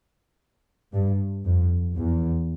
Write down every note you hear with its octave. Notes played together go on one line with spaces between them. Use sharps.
G2
F2
E2